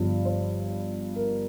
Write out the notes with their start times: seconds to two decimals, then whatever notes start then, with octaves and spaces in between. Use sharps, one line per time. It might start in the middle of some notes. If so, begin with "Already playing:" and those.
Already playing: G1 G2 F3
0.25 C5
1.16 A#4